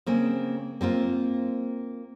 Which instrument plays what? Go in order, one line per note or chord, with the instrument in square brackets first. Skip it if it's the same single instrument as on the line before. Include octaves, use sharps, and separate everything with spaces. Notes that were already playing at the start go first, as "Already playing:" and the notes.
[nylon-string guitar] C#3 A#3 C4
A#3 C4 F4 A#4